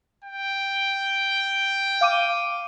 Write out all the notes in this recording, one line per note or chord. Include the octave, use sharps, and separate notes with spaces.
G5
F5 D6 D#7